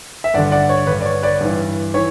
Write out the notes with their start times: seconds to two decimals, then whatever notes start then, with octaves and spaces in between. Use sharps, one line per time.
0.24 E5
0.34 G2 D5 F#5
0.38 D3
0.52 D5 F#5
0.69 C#5
0.87 G2 D3 B4
1.01 D5
1.05 C#5
1.23 B4 D5
1.41 G2 E3
1.94 E3 C#5